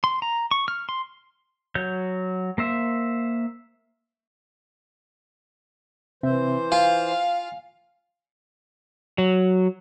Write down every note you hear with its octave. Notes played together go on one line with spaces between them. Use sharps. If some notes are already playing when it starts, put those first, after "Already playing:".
C6
A#5
C#6
F6
C6
F#3 C#5 G6
A#3 C5 E5
C3 E3 C4 C5 E5
F4 F5 G#5
F#3